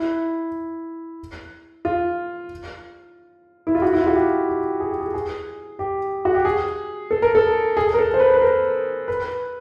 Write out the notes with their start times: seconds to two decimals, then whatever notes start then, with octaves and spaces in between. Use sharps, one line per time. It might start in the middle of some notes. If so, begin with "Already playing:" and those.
Already playing: E4
1.85 F4
3.67 E4
3.75 F4
3.82 F#4
3.93 E4
4.01 F4
4.07 F#4
4.15 G4
4.48 G4
4.80 G#4
4.91 G4
5.00 G#4
5.14 G#4
5.79 G4
6.25 F#4
6.35 G4
6.45 G#4
7.11 A4
7.22 A#4
7.35 A4
7.77 G#4
7.94 A#4
7.99 A4
8.14 C5
8.20 B4
8.35 B4
8.42 A#4
9.08 B4